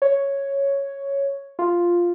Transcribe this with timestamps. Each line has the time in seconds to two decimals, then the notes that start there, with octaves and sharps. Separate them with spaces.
0.02 C#5
1.59 F4